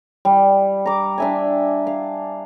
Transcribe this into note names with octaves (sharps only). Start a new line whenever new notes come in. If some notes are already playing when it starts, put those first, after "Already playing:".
G3
A#5 D6
D4 E5 G#5
F5